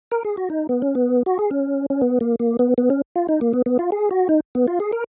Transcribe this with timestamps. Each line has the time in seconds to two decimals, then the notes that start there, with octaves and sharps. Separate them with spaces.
0.12 A#4
0.25 G#4
0.37 F#4
0.50 D#4
0.69 B3
0.82 C#4
0.95 B3
1.26 F#4
1.39 G#4
1.51 C#4
1.90 C#4
2.01 B3
2.21 A#3
2.40 A#3
2.59 B3
2.78 B3
2.90 C#4
3.16 F4
3.29 D#4
3.41 A#3
3.53 B3
3.66 B3
3.79 F4
3.92 G#4
4.11 F#4
4.29 D#4
4.55 B3
4.68 F4
4.80 G#4
4.93 A#4